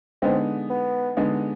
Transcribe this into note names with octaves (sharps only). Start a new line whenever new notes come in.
D3 G#3 B3 C4 D#4
B3
D3 G#3 B3 D#4